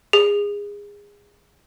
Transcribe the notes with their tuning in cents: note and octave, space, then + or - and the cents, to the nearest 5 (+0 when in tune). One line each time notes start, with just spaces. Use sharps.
G#4 -25